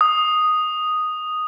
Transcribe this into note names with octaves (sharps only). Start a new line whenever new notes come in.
D#6